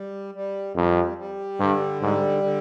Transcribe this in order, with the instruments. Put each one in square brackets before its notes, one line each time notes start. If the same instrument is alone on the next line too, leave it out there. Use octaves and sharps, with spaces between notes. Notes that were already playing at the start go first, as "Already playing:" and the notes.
Already playing: [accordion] G3
G3
[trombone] F2 [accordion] G3
[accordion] G3
[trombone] G2 [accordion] D3
[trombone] G#2 [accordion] G3
[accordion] D3